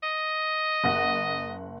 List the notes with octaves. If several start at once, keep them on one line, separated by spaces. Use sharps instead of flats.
D#5
F#1 F#5 A#6